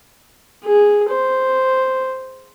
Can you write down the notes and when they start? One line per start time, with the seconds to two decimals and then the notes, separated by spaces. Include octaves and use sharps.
0.65 G#4
1.11 C5